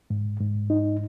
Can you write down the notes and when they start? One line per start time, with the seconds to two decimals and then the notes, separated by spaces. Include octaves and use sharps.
0.10 G#2
0.40 G#2
0.70 D#4